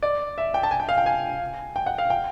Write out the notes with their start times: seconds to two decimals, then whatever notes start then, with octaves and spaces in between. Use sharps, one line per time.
0.03 D5
0.38 E5
0.54 G5
0.63 A5
0.71 G#5
0.80 G5
0.89 F5
0.98 G5
1.06 G#5
1.76 G5
1.86 F#5
1.98 F5
2.10 G5